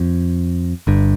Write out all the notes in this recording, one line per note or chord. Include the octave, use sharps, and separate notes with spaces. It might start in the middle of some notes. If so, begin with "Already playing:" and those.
Already playing: F2
G1 G2